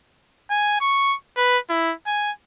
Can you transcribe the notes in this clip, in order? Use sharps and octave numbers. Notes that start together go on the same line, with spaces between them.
G#5
C#6
B4
E4
G#5